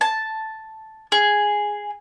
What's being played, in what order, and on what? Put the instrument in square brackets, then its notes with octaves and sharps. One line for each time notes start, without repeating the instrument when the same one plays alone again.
[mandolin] A5
G#4